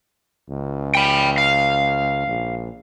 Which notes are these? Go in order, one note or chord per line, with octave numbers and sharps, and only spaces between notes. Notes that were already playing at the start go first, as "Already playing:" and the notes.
C#2
G5 B5
F5
A#1